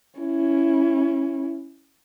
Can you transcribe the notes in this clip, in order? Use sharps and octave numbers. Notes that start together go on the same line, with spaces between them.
C#4 E4